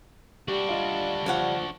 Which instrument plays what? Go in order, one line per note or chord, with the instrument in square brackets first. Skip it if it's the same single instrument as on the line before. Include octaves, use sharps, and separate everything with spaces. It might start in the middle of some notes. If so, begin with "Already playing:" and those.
[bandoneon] G3 [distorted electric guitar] D4 F#4 [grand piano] G4
[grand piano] F4 D#5
[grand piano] F3 [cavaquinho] C#5 F5 F#5